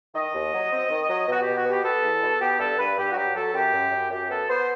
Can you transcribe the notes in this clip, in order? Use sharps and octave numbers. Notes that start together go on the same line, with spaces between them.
D#3 D#5
D#2
F#3
C4
D#3
F#3
B2 F#4
G4
B2
F#4
B3 G4
B3 A4
E2
B2
B3 G4
G2 A4
G2 B4
G2 G4
F#4
F#3 G4
F#3 A4
F#2 G4
F#2
F#2
F#2 G4
B3 A4
B3 C5